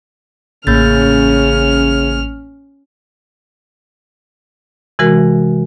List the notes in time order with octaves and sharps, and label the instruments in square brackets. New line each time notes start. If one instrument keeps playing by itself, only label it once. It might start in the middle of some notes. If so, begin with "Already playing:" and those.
[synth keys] A1 [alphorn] C#3 [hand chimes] A#3 G6 A6 [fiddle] C#4 F6
[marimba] C3 E3 G#3 F#4 A#4